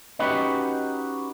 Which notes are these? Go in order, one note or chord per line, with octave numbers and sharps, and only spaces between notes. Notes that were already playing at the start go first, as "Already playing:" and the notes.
C#4 D#4 F#4 G4 B4